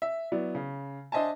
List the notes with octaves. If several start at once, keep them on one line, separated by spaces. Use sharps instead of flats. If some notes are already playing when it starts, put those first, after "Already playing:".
E5
F#3 B3 E4 D5
C#3
D4 C5 D#5 E5 G#5 A5